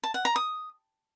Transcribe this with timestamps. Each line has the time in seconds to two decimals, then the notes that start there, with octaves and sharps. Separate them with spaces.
0.04 A5
0.14 F#5
0.25 A#5
0.36 D#6